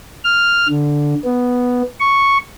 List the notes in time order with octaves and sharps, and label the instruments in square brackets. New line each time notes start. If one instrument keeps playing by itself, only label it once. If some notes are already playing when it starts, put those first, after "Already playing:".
[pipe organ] F6
D3
B3
C#6